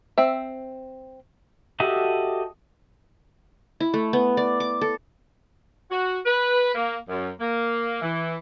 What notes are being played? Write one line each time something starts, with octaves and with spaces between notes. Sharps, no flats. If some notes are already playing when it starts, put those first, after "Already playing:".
C4 E5
F#4 G4 A4 D#5 E5
E4
A3
B3
D5
D6
A4
F#4
B4
A#3
F#2
A#3
E3